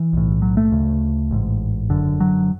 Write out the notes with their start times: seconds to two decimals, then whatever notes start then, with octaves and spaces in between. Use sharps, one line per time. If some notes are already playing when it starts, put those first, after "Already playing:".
Already playing: E3
0.13 B1 A2
0.42 F#3
0.57 A3
0.72 D2 C#3
1.31 A1 G#2
1.90 F#1 F#2 D3
2.20 F#3